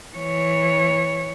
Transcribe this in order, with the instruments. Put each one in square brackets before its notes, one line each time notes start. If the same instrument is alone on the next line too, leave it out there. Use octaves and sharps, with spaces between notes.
[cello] E3 C#5